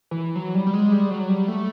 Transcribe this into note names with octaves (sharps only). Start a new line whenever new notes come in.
E3
F#3
G3
G3
G#3
G3
F#3
G3
A3